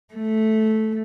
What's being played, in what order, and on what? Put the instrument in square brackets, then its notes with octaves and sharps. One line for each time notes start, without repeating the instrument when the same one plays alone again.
[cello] A3